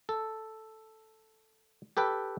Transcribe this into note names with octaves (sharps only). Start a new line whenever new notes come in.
A4
G4 A4 B4 G5